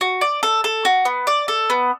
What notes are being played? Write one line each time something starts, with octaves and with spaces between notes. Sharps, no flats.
F#4
D5
A4
A4
F#4
B3
D5
A4
B3